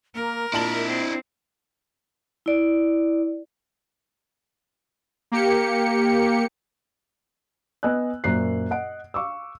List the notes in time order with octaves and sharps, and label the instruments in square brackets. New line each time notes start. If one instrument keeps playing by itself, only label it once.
[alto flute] A#3 [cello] A#4
[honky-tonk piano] A#2 A5 F#7 [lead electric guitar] D4 E4 [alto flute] E5
[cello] C4
[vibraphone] E4 D5
[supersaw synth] A#3 G4 C#7
[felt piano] B3 D#5 G#5 E6 F#6
F#2 A#2 A#3 C5 F#6 C7
D#5 F#5 D7
F5 C#6 D6 E6